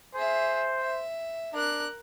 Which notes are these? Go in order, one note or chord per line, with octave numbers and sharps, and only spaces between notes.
G#4 C5 E5
E5
D4 A#4 F#6